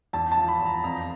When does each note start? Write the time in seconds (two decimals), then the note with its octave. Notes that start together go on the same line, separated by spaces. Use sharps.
0.13 E2 A5
0.32 A5
0.37 F3
0.48 B5
0.60 E2
0.66 A#5
0.84 F2 A#5